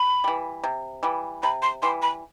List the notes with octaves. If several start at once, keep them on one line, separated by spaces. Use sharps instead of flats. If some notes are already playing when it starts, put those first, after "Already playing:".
Already playing: B5
E3 G3
C3
E3 G3
C3 B5
C6
E3 G3 C6
B5